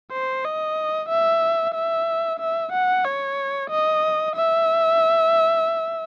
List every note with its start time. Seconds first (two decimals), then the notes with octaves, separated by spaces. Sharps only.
0.12 C5
0.45 D#5
1.09 E5
1.74 E5
2.40 E5
2.73 F#5
3.05 C#5
3.70 D#5
4.36 E5